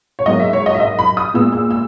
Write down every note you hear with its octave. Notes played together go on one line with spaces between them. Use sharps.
C#5
G#2 F#3 A#3 D#5
E5
C#5
D#5
E5
D#5
B5
D#6
A#2 G#3 B3 E6
E6
E6